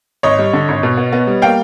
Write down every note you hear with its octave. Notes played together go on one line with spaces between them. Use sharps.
G#1 C#5 D#5
G3
D3
G#1
B2
B3
B3
G3
A#3 F5 G5